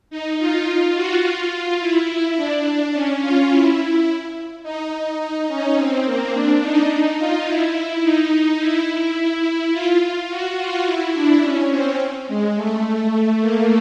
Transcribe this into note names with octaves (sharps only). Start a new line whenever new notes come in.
D#4
F4
F#4
F4
E4
E4
D4
C#4
F4
E4
D#4
D#4
C#4
C4
A#3
D4
D#4
F4
E4
E4
D#4
E4
E4
F4
F4
F#4
F4
E4
D4
C#4
C4
G#3
A3
A#3